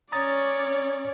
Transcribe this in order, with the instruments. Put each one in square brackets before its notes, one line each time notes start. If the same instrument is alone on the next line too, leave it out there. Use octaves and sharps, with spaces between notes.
[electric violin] C#4 D5 [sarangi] C#5 [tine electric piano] A#5 D#6 A6